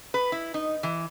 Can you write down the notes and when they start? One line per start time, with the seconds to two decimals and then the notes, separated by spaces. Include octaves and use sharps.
0.14 B4
0.32 E4
0.54 D#4
0.83 E3